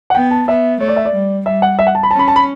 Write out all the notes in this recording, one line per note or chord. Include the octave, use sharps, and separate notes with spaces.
F#5
B3 G5
A5
B3 E5
A3 C#5
D5
E5
D5
G3
G3 E5
F#5
E5
F#5
A5
B5
C#4 A5
B5
A5
B5